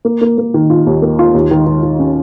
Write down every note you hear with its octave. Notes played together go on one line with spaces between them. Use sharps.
A#3
A#3
A#3
D#3
F4
D#2
A#3
F4
D#2
D#3
D#3
D#3
C#4